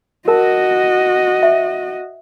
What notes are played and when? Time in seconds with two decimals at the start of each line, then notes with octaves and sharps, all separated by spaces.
0.28 F#4 A#4 D#5 A5
1.43 E5